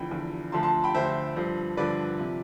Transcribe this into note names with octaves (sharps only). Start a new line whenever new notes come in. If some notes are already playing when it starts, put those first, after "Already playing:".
Already playing: E2 D3 F3 G5 B5
E2 D3 F3
D2 D3 F3 A5 C6
A5 C6
G5 B5
D2 D3 F3 C5 E5
G2 D3 F3 C5
G2 D3 F3 B4 D5
C3 F3